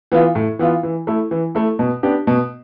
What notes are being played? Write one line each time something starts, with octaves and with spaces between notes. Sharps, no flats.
E3 B3 F4
A2
E3 B3 F4
E3
A3 E4
E3
A3 E4
B2
B3 D4 G4
B2